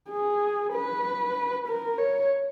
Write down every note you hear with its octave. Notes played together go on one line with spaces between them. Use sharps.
G#4
B4
A#4
C#5